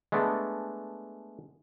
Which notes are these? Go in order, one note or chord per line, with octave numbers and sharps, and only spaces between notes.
G#3 A3 B3 D4